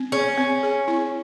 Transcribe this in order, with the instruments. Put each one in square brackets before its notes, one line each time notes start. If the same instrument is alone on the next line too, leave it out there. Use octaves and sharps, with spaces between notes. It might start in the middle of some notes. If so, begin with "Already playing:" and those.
Already playing: [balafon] C4
[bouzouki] C#4 [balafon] G#4
[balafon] C4
G#4
E4